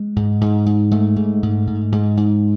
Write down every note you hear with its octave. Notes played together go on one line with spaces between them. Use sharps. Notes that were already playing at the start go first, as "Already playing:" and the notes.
Already playing: G#3
G#2
G#2
G#2
G#2 A3
G#2
G#2
G#2
G#2
G#2